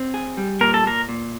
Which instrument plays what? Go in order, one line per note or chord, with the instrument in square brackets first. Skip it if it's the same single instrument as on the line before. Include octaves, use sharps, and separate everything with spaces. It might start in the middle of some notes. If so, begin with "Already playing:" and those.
Already playing: [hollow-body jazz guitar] C4
G#4
G3
[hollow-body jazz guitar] A#2 [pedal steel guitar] A#4
[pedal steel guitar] A4
[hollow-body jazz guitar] A#2 [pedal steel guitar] A#4
[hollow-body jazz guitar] A#2